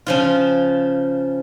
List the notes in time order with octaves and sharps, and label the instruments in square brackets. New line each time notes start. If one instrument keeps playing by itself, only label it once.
[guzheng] C#3 F3 F4